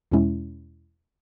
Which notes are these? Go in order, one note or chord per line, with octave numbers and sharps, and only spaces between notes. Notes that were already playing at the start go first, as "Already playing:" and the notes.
E2 B2 G#3 C#4 E4